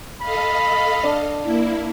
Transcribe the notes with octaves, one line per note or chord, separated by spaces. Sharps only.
A4 D#5 F5 B5
D4
A#3 E4